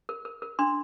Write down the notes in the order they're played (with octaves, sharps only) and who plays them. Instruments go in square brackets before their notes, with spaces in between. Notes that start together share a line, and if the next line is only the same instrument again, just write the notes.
[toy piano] A#4
A#4
A#4
D4 C6